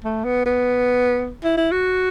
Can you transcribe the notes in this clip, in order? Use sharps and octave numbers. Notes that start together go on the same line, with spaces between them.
A3
B3
B3
E4
E4
F#4